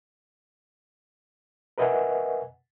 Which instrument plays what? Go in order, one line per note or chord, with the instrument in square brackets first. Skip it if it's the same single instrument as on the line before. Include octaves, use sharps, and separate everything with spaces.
[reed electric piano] A#4 B4 D#5 E5 F#5 G#5